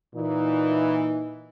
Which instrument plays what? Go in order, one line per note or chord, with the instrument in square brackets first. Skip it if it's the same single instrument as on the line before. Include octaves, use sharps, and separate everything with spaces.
[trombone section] A#2 D#4 [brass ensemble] E3